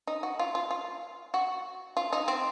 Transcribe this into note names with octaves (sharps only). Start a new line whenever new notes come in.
D#4
F#4
F4
F4
F4
F#4
F4
D#4
C4